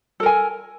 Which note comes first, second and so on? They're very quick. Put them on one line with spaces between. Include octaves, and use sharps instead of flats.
A4 A#4 G#5